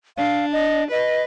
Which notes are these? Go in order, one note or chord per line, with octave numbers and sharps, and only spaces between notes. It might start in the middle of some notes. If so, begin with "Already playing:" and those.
D4 F5
D#5
B4 D#5